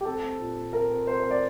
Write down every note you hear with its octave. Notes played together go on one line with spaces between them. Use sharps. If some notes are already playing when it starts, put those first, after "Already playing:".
G4
C4 A4
C4
A#2
A#2
C4 A#4
C4
C4 C5
C4 C5
D5